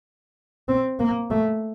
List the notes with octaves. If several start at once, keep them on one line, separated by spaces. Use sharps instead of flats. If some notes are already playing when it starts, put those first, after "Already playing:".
C4
A#3
A3